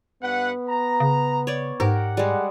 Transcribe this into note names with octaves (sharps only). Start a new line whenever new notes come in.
G2 B3 B4 F#5
A#5
C#3
C#5 D5
G#2 G4 A#4 F#5
G3 G#3 G#4